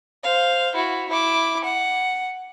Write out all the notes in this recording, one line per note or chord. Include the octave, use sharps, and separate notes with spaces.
C5 F5
E4 F#4
E4 D6
F#5